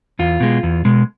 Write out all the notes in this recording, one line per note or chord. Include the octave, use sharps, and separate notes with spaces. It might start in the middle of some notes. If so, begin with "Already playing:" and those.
E2 F4
B2 G#3
E2
B2 G#3